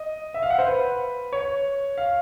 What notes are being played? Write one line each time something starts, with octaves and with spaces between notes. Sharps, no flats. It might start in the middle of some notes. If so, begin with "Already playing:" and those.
Already playing: D#5
E5
F5
F#5
C5
B4
C#5
F5